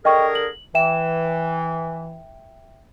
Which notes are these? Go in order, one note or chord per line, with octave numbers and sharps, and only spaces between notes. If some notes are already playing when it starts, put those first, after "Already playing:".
D3 G#4 A#4 D#5 G5 C#6
F#7
E3 E5 G5 E7